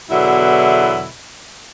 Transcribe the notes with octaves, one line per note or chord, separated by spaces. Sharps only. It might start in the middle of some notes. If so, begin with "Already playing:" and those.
E2 B2 D3 F#3 E4